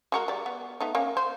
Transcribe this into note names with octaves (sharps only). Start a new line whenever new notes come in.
G#3 F#4 A#4
G3 D5
B3
A3 B3 D#4
A#3 C#4
C5